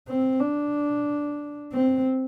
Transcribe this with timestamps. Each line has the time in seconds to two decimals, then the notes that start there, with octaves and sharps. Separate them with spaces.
0.08 C4
0.41 D4
1.73 C4